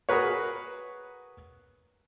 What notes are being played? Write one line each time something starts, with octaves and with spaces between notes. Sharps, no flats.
F#4 G#4 A#4 B4 C#5